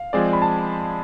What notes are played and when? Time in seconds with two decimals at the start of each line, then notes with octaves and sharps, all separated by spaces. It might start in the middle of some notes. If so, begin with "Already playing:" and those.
Already playing: F5
0.13 F3 G#3 C4 G#4 D5
0.33 B5
0.42 A5